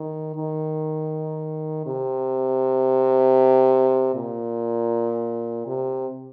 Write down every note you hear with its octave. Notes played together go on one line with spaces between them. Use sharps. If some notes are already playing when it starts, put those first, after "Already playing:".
Already playing: D#3
D#3
C3
A#2
C3